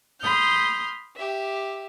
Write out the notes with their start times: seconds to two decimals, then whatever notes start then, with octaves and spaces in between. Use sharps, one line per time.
0.21 B5 C6 D#6 F6 G6
1.15 G4 E5